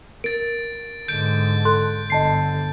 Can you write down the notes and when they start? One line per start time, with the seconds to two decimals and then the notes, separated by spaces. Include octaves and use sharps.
0.24 A#4 A6 D7
1.08 G#2 D3 G6 D7
1.65 A4 C6 F#6
2.10 G1 D3 D#5 A5 C7